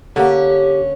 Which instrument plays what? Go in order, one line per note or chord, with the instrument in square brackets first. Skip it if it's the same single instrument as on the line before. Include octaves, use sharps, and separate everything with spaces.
[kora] D3 A#3 [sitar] C#4 [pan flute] G4